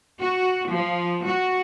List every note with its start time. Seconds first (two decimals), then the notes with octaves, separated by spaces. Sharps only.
0.20 F#4
0.72 F3
1.26 F#4